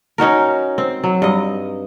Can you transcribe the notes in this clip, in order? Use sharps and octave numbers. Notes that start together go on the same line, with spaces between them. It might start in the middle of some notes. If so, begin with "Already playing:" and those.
C#4 D#4 F#4 A#4
C4
F#3
G2 D#5